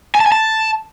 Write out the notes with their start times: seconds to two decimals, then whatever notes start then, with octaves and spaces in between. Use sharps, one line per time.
0.15 G#5
0.20 A5
0.26 G#5
0.32 A5